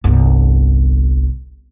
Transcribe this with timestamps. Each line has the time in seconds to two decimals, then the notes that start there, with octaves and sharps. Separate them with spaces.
0.04 G1 C2